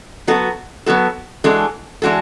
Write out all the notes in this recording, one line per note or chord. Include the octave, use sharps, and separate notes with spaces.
F#3 B3 F#4 A4
F#3 B3 F#4 A4
E3 G#3 D4 F#4 A4
E3 G#3 D4 F#4 A4